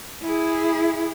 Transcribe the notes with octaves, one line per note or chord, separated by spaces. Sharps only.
E4 G#4